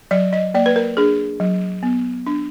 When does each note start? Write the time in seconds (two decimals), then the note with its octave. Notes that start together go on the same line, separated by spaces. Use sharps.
0.11 F#3 D5
0.33 D#5
0.54 A#3 D5
0.66 B4
0.76 A#4
0.97 D4 G#4
1.40 F#3
1.83 B3
2.26 D4